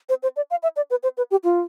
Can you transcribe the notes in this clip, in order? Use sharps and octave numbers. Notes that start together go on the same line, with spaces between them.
C5
C5
D5
F5
E5
D5
B4
C5
B4
G4
F4